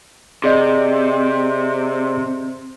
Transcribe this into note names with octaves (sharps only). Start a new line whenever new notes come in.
C3 G#4 D5 D#5